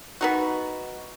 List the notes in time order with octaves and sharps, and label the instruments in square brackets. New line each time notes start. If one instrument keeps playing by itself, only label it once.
[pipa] B3 D#4 F#4